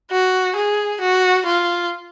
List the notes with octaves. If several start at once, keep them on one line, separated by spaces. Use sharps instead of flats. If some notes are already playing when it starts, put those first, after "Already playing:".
F#4
G#4
F#4
F4